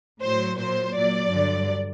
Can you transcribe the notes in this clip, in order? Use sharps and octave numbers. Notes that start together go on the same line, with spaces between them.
A2 F#3 C5
A#2 F#3 C5
A#2 F#3 D5
G2 D3 F#3